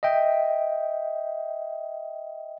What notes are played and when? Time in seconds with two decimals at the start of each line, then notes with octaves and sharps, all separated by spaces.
0.03 D#5 E5 G5